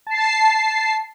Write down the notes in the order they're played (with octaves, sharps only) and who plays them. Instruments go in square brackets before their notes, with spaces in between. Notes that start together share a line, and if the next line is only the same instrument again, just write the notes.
[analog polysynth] A5 C7